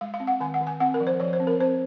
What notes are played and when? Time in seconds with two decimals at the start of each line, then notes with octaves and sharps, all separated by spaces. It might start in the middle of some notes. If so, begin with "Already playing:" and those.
0.01 G#3 F5
0.14 F5
0.20 C4
0.27 F#5
0.40 D#3 G#5
0.54 F#5
0.61 D#3
0.67 G#5
0.80 C4 F#5
0.94 A#4
1.00 F3
1.07 C5
1.20 F3 C#5
1.33 C5
1.40 C4
1.47 A#4
1.60 C4 C5